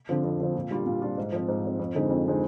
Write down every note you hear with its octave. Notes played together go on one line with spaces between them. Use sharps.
D3 F3 C4
F2
D3 F3 C4
A#2
G3 D4 F4
A#2
G3 D4 F4
G#2
F3 C4
G#2
F3 C4
F2
D3 G#3 C4 D#4
F2
D3 G#3 C4 D#4